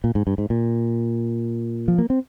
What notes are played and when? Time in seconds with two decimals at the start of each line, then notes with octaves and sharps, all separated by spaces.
0.04 A#2
0.15 G#2
0.27 G2
0.38 G#2
0.50 A#2
1.88 F3
1.98 A#3
2.10 C4